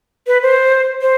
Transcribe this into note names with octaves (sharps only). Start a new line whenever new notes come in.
B4
C5
C5